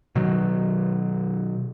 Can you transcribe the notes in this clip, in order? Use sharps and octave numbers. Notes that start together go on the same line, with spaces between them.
B2 D#3 F#3